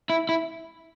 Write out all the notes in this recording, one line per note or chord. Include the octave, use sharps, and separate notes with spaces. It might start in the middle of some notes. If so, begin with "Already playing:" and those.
E4
E4